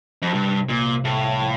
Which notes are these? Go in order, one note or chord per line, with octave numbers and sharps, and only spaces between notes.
F2
G2 C3
C2 A#2
A2 A#3
F3